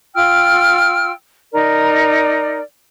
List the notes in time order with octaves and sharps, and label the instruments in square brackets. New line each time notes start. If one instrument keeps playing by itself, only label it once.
[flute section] F4 G5 E6 F6
D#4 A#4 D5